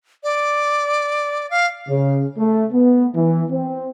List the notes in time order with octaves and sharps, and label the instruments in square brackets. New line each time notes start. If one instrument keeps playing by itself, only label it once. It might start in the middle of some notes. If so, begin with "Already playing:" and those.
[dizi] D5
F5
[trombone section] C#3
A3
B3
E3
C4